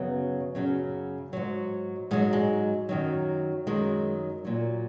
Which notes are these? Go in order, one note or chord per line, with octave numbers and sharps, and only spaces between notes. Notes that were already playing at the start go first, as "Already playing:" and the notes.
Already playing: F#2 C#3 F#3 B3
F#2 C#3 F#3
G#2 F#3
G#2 F#3 G#3
G#3
F#2 D#3 F#3
F#2 D#3 F#3 G#3
A#2 F#3